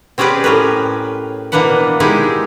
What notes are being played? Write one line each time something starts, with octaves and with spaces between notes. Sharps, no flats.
C4 C#4 G4 G#4 B4 D5
A2 C#4 A#4 B4
B2 E3 A#3 D4 B4 F#5
G#3 D#4 E4 G4 G#4